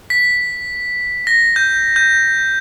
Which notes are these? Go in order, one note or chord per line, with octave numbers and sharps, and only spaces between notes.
B6
A#6
G6
G6